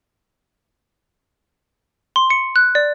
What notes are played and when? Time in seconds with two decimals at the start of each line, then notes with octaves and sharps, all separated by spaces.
2.16 C6
2.30 C#7
2.56 F#6
2.75 D5